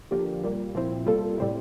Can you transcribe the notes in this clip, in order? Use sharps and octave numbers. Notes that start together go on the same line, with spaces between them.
D3 F3 A#3 D4 G4
A#2 G3 A#3
A#2 F3 C4 E4
C3 G3 A#3 F4 A4
A2 G3 C4 E4